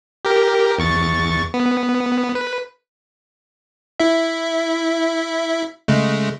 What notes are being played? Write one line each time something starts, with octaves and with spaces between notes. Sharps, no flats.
G4 A#4
E2 C#6 A6
B3
B4
E4 E5
C#3 G#3 A3